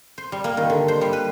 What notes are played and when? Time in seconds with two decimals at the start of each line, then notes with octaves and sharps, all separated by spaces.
0.18 C5
0.32 G3
0.44 A#3
0.57 D#3
0.70 D3
0.88 C5
1.01 G3
1.13 B4